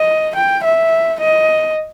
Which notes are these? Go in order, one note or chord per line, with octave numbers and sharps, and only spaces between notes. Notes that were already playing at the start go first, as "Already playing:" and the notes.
Already playing: D#5
G5
E5
D#5